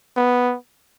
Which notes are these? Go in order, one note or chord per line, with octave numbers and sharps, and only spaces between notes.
B3